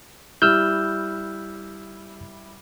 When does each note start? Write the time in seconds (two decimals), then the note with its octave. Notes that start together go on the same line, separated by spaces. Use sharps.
0.42 G3 E4 E6 F6 G6